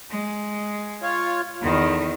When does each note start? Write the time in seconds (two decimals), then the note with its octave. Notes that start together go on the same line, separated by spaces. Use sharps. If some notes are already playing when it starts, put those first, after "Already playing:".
0.10 G#3
1.02 F4 C#5
1.61 E2 D3 D#3